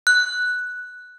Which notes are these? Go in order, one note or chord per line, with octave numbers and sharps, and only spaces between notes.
F#6